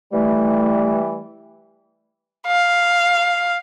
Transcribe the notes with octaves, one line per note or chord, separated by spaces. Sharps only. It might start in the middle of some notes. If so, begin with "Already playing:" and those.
E3 G3 A3
F5